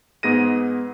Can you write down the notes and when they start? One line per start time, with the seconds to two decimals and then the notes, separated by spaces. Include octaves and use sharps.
0.23 G#2 B3 G#4 A#6 D#7